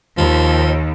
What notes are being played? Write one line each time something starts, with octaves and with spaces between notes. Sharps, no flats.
D#2 F3